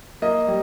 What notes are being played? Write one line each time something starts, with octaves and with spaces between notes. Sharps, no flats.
A#3 D#5
G3